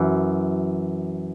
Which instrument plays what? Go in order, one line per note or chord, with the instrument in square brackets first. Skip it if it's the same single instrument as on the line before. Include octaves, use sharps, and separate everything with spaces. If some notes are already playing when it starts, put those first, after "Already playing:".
Already playing: [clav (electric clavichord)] F#2 E3